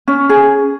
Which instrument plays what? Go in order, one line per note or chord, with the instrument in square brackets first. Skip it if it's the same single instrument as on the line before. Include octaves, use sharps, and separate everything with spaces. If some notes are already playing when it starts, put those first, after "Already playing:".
[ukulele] C#4
G#4